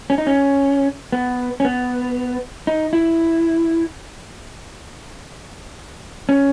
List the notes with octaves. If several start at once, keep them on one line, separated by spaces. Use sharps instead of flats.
C#4
D#4
C#4
B3
C#4
B3
D#4
E4
C#4